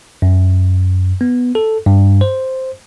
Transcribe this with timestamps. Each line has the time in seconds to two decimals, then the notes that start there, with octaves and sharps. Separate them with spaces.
0.22 F#2
1.21 B3
1.55 A4
1.86 G2
2.21 C5